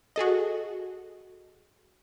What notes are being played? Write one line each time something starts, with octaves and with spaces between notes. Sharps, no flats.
F#4 G#4 A4 D#5